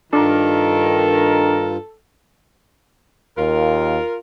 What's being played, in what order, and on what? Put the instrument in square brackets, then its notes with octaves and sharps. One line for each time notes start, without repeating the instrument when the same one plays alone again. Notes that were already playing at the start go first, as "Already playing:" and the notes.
[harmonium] G2 F4 [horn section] D#3 A#4 [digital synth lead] D4 [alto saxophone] A4
[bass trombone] D#2 [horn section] F4 A#4